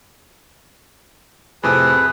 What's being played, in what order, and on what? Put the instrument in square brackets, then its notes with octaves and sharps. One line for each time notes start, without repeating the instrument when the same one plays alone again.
[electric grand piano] F2 A2 C3 [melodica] G#4 B4